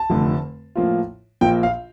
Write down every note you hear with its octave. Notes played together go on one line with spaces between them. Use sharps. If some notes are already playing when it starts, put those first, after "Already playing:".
Already playing: A5
F1 F2 D3 A3
A2 F3 A#3 F4
A#1 A#2 F3 A#3 G5
F5